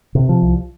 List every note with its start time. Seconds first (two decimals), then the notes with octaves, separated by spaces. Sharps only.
0.15 C3
0.29 F3
0.43 C2